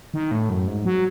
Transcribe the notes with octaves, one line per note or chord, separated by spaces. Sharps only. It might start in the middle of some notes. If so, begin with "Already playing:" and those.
D#3
A2
F#2
G#2
F#3